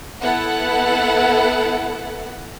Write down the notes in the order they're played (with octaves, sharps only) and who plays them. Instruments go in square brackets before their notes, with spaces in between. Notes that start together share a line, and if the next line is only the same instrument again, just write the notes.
[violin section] B3 E4 A4 F#5